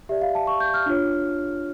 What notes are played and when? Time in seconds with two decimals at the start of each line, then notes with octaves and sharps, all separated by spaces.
0.09 G4 D5 E5
0.21 F5
0.35 A5
0.47 C#6
0.60 G6
0.74 F6
0.86 D4 F4 C#5